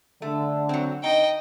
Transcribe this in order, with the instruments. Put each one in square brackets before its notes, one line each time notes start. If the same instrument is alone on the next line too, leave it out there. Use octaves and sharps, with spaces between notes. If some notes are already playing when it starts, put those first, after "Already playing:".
[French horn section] D3 [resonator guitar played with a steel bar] A3
[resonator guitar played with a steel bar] F#3 C4
[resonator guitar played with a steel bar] D#4 [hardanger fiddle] D#5 G5